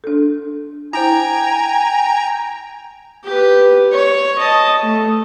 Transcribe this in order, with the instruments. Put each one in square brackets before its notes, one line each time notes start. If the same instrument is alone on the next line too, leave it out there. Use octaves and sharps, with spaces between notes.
[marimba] D4 A4
[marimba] E4 C5 [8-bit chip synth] G5 A#5 [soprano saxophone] G#5
[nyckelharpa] G4 B4
C#5
D#5 A5
A3